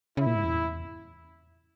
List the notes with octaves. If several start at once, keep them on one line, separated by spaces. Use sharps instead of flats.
C#3 E4
A#2
G#2
E2